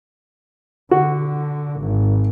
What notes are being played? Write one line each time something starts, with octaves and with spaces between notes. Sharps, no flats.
D3 F#4
G#1